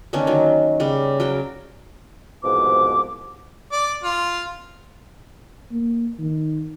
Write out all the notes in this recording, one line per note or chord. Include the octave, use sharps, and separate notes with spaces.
D3 D#3 A#3 C#4
D#3 F#3
C#3 G3
F#3 A#4 G5
C2 G#2 B2 F3 B4 D6
D5
F4
A#3
D#3